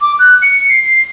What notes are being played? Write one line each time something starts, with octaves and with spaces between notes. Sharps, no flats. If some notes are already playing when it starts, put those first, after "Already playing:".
D6
F#6
C#7
C7
C7